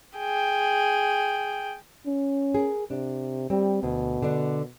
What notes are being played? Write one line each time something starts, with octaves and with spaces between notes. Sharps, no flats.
G#4 G5
C#4
G#4 A#4
C3 D4
G3 C4
D2 B2
D3 D4